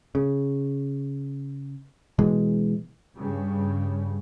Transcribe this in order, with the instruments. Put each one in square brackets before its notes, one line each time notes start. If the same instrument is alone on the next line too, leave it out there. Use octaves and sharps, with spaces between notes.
[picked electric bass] C#3
B2 E3 G#3
[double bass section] G2 C#3